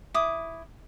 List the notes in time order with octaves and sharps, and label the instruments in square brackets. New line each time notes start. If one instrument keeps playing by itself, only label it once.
[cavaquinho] E4 D6 D#6